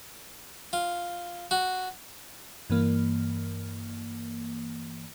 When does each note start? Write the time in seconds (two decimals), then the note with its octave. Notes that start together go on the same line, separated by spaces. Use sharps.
0.73 F4
1.51 F#4
2.70 G2 E3 A#3